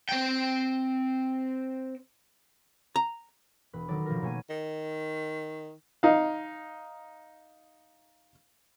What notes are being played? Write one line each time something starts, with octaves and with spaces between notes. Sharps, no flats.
C4 G5
A#5
E1 B4
D#3 F#3 D#4 A4 D5
B2 F3 F#4 A#4
B2 A#3 C#5 G#5 D#7
D#3
D#4 F5